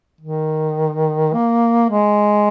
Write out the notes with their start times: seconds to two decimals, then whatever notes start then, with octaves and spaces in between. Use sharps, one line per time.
0.21 D#3
1.33 A#3
1.90 G#3